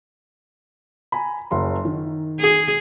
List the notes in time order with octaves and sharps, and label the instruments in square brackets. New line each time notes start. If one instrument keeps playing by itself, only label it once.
[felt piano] G#5 A#5 B5
F#1 F#3 C6
D#3
[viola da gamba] G#4